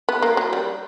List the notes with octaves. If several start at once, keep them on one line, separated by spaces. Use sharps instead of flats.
B3
A#3
F#3
G3